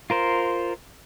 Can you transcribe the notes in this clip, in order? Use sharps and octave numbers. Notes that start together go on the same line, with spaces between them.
F4 A#4 C5